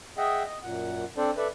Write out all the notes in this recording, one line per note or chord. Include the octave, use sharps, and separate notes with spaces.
G#4 D#5 E5 F#5 G5
D#5
F#2 A#2 F#5
C4 D4 A4 C5 D5
A4 B4 D5 E5